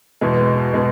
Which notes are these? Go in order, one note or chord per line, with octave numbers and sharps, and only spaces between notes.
E2 B2 G#3
B2 G#3